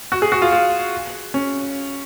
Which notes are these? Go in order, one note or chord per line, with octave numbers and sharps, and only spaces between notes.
F#4
G#4
F#4
F4
F4
C#4